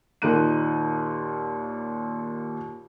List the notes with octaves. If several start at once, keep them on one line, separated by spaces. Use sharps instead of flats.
D#2 A#2 D#4 F#6 D#7